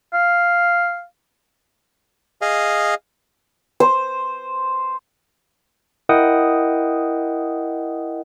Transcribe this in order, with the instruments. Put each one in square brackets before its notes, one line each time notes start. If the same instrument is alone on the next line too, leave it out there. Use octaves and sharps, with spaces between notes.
[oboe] F5
[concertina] G#4 D#5 F5
[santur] C5
[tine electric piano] E4 A#4 D#5 F#5 G5 D#6